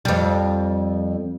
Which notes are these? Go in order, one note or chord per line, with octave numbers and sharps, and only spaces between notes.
F2 G3